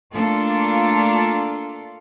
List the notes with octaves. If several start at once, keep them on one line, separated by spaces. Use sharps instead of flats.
A3 A#3 D4 F4 A4